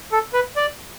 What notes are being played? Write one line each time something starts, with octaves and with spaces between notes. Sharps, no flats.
A4
B4
D5